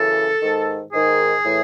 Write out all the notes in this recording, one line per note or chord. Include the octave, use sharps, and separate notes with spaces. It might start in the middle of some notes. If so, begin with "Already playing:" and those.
Already playing: F#2 C#3 E3 A4
G#2 D#3
G#2 D#3 G#4
A2 E3